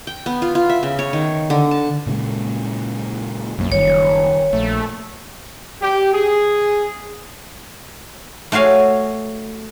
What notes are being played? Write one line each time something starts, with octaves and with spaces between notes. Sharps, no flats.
G5
B3
F4
F4
E5
C#3
C#5
D#3
D3
A5
A#2 C#3 G#3
B1 F#2 D#3 A#3
F#1 D#3 G3 C#5
A#1 A3
G4
G#4
A3 F#4 C#5 F5 G#5